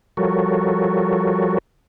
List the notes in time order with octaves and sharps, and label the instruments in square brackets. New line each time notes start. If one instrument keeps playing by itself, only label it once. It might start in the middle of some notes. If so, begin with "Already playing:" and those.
[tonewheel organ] F3 G3 F#4 A4 A#4 C#5